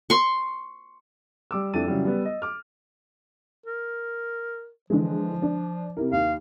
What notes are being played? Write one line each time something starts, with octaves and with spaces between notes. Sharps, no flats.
C6 C#6
G3 D6 E6
F2 A3 D4 E4 A6 D#7
C#3 E3 F#3 G3
G3 B3
D#5
D6 F6
A#4
D3 E3 F3 G#3
D4
C3 E4 A#4
D#2 F5